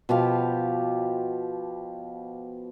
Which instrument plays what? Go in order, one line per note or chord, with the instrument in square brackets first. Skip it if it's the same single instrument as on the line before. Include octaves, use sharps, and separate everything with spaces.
[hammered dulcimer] B2 F3 G4 F5